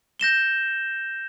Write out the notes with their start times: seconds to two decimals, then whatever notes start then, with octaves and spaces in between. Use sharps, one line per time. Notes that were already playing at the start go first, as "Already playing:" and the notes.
0.20 G6 A#6 E7 G7